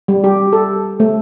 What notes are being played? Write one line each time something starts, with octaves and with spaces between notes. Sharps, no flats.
G3
G4
A4
A3